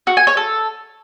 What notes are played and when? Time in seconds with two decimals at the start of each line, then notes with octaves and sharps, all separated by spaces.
0.07 F#4
0.17 G#5
0.27 C#5
0.37 A4